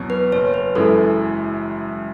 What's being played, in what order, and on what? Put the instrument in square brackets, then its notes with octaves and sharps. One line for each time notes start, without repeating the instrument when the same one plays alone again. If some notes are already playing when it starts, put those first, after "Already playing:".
Already playing: [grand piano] E2 B2 F#3
[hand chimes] B4
[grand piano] F#1 [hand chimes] C#5
[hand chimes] B4
[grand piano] F#2 E3 G#3 [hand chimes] A4